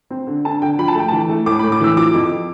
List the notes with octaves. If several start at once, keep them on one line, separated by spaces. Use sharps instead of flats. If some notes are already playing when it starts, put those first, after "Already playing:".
C4
D3
D3 A5
D3 G5
F3 B5
A5
A3 G5
E3 A5
A3
A2 D6
B5
A2
D6
E3 E6
F3 D6
F2